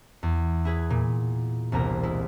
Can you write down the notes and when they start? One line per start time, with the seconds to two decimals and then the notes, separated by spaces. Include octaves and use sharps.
0.23 E2
0.65 E4 G#4 B4
0.90 A#2
1.72 E1 C2 A#3 A#5
2.03 G#3 E4